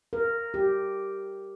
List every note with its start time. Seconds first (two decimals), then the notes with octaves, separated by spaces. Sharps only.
0.13 A#4
0.54 G4